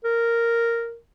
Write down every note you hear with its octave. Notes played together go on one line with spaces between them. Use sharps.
A#4